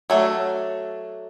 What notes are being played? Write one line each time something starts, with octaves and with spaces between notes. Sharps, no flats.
F#3 A3 D4